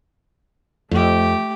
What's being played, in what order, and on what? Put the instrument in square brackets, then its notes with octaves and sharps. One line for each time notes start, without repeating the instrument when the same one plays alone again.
[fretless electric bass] F2 [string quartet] A3 G4